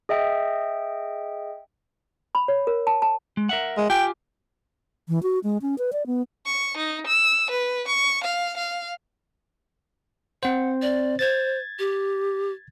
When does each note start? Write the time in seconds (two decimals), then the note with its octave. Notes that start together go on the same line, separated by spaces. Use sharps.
0.09 G#4 D#5 E5 G5
2.35 B5
2.48 C#5
2.67 A#4
2.87 A5
3.02 A5
3.37 G#3
3.49 A#4 E5 F#5
3.77 G#3
3.90 F4 G4 G5 G#5
5.09 E3
5.23 F#4
5.44 G#3
5.62 C#4
5.78 B4
5.93 D5
6.06 B3
6.46 C#6
6.77 D#4
7.07 E6
7.51 B4
7.88 C#6
8.24 F5
8.57 F5
10.43 C4 C5 F#5
10.82 D5
11.19 C5 G#6 A6
11.79 G4